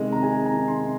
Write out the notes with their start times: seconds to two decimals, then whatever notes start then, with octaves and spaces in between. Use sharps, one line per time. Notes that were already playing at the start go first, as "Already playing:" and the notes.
Already playing: C3 D#3 G#3
0.12 A#5
0.23 G#3 G#5
0.46 A#5
0.54 D#3
0.68 C6
0.83 C3